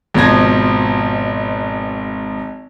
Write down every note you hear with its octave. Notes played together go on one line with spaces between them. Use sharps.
G#1 B2 F3 G#6 A#6